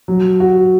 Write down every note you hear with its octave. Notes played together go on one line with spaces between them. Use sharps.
F#3
F#4